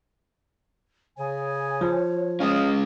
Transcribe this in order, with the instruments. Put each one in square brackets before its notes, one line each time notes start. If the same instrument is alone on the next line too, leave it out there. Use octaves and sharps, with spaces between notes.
[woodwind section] C#3 G#5 [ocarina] C#5
[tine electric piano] F3
[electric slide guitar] G#3 C#4 [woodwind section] D#5 F5